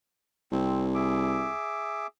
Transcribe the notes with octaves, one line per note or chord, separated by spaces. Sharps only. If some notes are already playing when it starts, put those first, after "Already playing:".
C2 C4
G#4 E5 D6